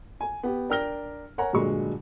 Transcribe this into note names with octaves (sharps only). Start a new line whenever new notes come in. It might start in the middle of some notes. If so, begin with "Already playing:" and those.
G#5
B3 G4
D4 A#4 G5 F6 A#6 G7
A#4 C#5 F#5 G#5 A#5
G2 A#2 D3 F#3 G#3 C#6